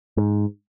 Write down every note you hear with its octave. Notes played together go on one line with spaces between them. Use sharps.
G#2